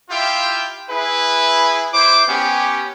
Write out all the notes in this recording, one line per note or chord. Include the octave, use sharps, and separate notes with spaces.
E4 F4 G4 E5 F5 G5
E4 G#4 B4
E4 C5 D6
B3 C#4 G4